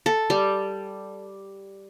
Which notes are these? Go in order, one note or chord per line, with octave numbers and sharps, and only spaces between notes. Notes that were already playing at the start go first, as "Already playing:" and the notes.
A4
G3